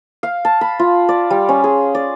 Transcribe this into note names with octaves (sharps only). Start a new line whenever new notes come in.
F5
A5
B5
F4
D5
G3
C#4
G#4
D5